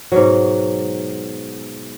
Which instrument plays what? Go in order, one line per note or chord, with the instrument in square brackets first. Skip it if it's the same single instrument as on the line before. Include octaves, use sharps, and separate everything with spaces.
[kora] G#2 B2 F#3